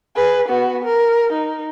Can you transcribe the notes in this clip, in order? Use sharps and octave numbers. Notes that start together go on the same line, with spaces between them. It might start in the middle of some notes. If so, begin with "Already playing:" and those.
G#4 B4
B3 F#4
A#4
D#4